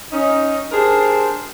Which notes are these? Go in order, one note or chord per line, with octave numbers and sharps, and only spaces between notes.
C#4 D#4
D4 G4 G#4 A#4 C5